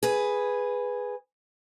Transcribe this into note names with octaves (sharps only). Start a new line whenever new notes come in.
G#4 B4